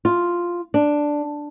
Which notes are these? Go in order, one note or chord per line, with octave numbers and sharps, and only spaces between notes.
F4
D4